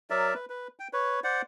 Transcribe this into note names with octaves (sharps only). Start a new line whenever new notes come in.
F#3 A#4 D5 E5
B4
B4
G5
B4 C#5
C5 D5 F#5